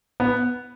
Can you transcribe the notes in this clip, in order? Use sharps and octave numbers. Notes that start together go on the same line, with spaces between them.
B3